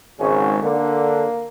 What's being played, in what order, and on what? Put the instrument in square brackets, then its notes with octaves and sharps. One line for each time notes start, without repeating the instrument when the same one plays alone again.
[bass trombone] G#1 [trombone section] G#2 C#3 C#4
[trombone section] D3 [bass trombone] A#3